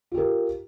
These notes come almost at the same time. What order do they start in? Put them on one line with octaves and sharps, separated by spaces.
F4 G4 A#4